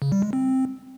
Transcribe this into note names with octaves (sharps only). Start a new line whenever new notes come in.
C#3
G3
G#3
C4